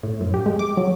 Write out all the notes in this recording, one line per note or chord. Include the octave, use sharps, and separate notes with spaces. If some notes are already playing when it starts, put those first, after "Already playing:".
A2
F#2
G4
G#3
D6
F#3